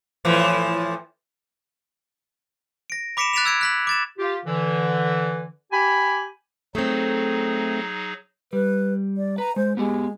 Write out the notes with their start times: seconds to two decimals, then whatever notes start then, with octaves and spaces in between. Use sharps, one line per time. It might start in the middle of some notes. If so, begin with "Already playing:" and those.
0.25 A2 E3 F3
2.90 A#6 D7
3.17 B5 D6 B6 C#7 D7 E7
3.33 F#6 A6 B6 D7 E7 F7
3.45 E6 G#6 D7
3.61 F#6 B6 F#7
3.87 D6 A6 E7
4.18 F4 G4
4.45 D3 E3
5.72 G4 G#5 B5
6.75 F#3 A3 C4 D#4 G#4
8.53 G3 B4
9.17 D5
9.38 B4 A#5
9.56 G#3 C5
9.77 G#3 B3 F#4 G4